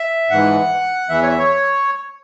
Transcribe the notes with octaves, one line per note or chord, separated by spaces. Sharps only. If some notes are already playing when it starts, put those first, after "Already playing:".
Already playing: E5
G#2 E3 F#5
E2 E3 E5
C#5
E5
C#5